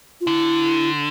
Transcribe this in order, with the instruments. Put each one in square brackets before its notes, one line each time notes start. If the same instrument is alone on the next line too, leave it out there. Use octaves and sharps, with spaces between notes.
[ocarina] F4
[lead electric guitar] D3 [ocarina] E4